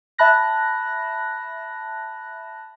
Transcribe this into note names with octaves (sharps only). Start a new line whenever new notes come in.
E5 A5 B5 F#6 A#6